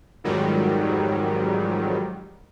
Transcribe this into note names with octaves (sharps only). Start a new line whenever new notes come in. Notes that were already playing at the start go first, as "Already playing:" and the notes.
F2 G#2 D#3 F#3 G3